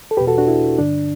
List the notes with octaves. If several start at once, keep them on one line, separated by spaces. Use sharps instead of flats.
A4
E2 B2 G4 B4
F#4 A4
D4 F#4
E4
G2 D3 D4